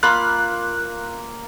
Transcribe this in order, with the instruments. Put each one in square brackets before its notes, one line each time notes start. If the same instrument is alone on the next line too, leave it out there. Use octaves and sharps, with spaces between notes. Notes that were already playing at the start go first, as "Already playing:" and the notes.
[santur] A#3 [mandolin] F4 B5 F6 [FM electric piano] F#6